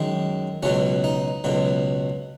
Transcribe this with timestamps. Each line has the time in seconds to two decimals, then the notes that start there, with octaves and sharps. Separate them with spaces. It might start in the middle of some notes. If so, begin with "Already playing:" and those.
Already playing: F#2 D#3 G#3
0.63 C#2 B2 F#3 C#4
1.04 D#4
1.44 C#2 B2 F#3